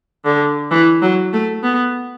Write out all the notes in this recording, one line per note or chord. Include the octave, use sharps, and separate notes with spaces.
D3
E3
F#3
A3
B3